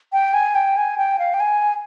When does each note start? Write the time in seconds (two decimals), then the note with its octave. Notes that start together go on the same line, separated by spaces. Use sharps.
0.13 G5
0.34 G#5
0.55 G5
0.77 G#5
0.98 G5
1.19 F5
1.34 G5
1.40 G#5